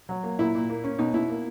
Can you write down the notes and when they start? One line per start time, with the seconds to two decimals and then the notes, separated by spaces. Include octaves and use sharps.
0.09 F#3
0.23 A#3
0.39 A#2 E4
0.55 A#2
0.70 A#3
0.84 C#4
0.99 B2 D#4
1.14 B2 E4
1.30 A#3